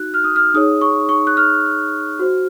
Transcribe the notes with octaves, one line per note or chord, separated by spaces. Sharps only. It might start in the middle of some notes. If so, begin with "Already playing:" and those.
Already playing: D#4 F#4 F#6
F6
D#6
F6
D#4 G#4 C#5 D#6
C#6
C#6
F#6
F6
F#4 C5